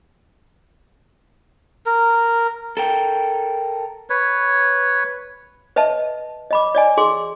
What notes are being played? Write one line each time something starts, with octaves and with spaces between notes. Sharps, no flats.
A#4
A4 A#4 G5
B4 C#5
B4 D#5 E5 A5
D#5 B5 D6
D5 D#5 G#5
G#4 C6 D6